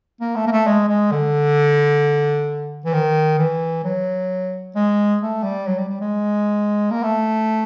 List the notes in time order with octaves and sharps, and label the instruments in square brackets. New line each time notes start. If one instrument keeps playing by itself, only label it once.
[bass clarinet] A#3
A3
A#3
A3
G#3
G#3
D3
E3
D#3
E3
F#3
G#3
A3
G3
F#3
G3
G3
G#3
A#3
A3